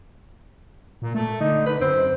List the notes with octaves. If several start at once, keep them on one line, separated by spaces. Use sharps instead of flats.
A#2
A3
D3 D#4
B4
F#2 C4